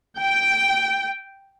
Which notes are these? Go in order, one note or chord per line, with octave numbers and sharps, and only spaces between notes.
G5